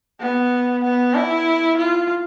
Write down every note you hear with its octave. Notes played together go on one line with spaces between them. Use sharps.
B3
B3
E4
F4